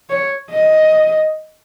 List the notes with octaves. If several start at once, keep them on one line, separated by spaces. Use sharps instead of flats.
C#5
D#5